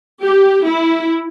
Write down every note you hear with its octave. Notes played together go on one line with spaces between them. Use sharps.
G4
E4